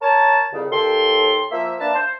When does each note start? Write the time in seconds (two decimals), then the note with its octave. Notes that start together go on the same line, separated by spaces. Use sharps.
0.02 A#4 C#5 A5
0.52 C2 F2 C#3
0.71 D#2 A4 G5 C6
1.51 F3 A#3 E5
1.80 A#3 D4 B4 E5 A5
1.94 C5